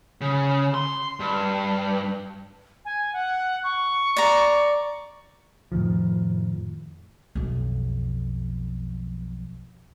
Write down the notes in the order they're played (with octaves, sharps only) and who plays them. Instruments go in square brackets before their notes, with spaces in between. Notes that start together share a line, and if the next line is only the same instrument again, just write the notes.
[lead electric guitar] C#3
C6
G2
[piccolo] G#5
F#5
C#6
[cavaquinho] D5 A#5
[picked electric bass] F2 A2 D#3 F3
[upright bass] B1 F2